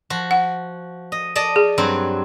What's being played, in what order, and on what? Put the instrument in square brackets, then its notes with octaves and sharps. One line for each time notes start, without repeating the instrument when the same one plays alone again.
[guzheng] F3 F#4
[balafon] F#5
[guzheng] D#5
D5 D#5 A5
[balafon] G#4
[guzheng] G2 F#3 C4